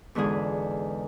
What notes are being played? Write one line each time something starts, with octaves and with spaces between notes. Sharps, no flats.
E2 G#2 D3 F4 G#4